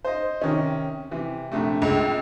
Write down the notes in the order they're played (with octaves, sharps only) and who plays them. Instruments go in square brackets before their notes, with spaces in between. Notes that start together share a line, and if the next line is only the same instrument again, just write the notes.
[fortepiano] C5 D#5
C3 D#3 C#4
C3 E3
A#1 C3 A3
[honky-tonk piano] C#2